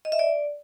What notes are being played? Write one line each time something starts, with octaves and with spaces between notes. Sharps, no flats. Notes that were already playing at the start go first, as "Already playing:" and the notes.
D#5
E5
D5